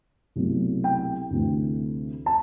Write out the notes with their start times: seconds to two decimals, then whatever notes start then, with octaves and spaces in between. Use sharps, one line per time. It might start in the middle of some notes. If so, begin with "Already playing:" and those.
0.36 C2 B2 F#3 A3
0.84 G5
1.31 D2 C3 E3 A3
2.26 A5